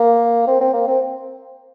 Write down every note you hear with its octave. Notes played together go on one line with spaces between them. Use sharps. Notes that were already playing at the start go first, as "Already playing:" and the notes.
Already playing: A#3
C4
C4
A#3
C4